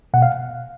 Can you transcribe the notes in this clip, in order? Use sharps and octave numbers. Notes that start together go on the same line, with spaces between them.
B2 F#5
F5